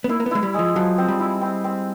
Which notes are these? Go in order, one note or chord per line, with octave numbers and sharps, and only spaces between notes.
B3
A#3 E4
A#3
B3
G#3 E4
G3
F3 G#3
F3 F#3
C4
G3
E4
C4
C4